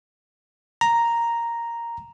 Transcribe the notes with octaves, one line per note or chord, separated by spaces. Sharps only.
A#5